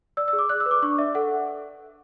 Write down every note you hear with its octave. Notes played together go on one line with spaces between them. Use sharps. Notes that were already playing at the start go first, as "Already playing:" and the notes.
D5 E6
E6
G#4
D6
D5 F#6
E6
B4
D6
D4 C#6
D5 E5
A4 F#5